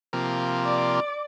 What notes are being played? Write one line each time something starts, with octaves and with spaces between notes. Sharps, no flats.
C3 F3 A#3
D5 D6